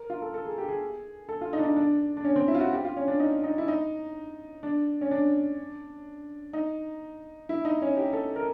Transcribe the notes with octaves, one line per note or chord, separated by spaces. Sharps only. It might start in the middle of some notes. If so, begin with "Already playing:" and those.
Already playing: A#4
F4
A4
A4
G#4
G4
G#4
A4
F4
D#4
D4
D#4
D4
D4
C#4
C4
E4
F4
F#4
G4
F4
C#4
D4
D#4
D#4
E4
D#4
D4
C#4
D4
D#4
E4
D#4
C#4
G4
A4
A#4